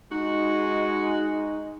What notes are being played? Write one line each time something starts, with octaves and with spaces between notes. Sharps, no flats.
G#3 D#4 F#4